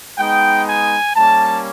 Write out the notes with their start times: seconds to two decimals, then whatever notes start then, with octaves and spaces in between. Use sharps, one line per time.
0.18 G#3 B3 D#4 G5
0.67 G#5
1.15 G3 A#3 C#4 A5